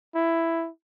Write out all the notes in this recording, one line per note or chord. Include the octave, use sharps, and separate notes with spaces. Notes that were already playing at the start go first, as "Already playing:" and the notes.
E4